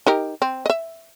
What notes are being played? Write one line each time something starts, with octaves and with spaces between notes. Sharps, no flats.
D#4 G4 A#4
C4
D#5 E5